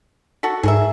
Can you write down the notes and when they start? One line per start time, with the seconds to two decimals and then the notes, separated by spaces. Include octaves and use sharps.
0.43 F#4 A4 B6
0.63 G#2 G#4 A#4 E5